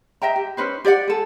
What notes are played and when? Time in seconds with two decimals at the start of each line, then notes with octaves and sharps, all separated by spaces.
0.22 D#5 E5 G5 A#5
0.36 G4
0.57 C#4 D#4 B4 C5
0.85 G4 D5 D#5 F#5
1.08 G#4 A4